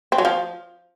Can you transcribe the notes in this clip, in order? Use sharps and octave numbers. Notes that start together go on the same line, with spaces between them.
C4
F#3
F3